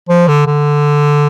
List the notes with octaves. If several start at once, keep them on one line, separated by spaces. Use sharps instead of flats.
F3
D3
D3